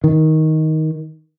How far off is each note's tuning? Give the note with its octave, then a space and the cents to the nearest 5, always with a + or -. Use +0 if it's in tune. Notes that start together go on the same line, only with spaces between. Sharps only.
D#3 +15